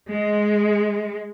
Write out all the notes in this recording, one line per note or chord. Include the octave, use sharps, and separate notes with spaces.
G#3